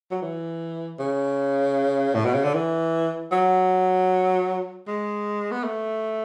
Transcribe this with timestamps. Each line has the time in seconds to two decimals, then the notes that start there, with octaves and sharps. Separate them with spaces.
0.11 F#3
0.22 E3
0.99 C#3
2.15 A2
2.25 B2
2.34 C#3
2.44 D3
2.54 E3
3.31 F#3
4.87 G#3
5.51 B3
5.64 A3